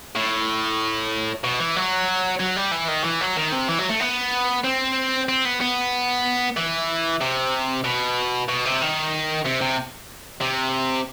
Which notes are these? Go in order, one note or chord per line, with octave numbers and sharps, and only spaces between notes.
A2
B2
E3
F#3
F#3
G3
E3
D#3
E3
F#3
D#3
C3
E3
F#3
A3
B3
C4
C4
B3
B3
E3
C3
B2
B2
C3
D#3
C3
C3
C3